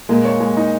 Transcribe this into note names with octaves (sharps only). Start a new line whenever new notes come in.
A#2 G#3 A#3
C#5
G#3
D#4